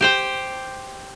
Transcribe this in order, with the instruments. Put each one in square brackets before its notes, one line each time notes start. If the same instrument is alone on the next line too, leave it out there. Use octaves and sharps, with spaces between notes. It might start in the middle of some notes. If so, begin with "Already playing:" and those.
[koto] G4 C5 G5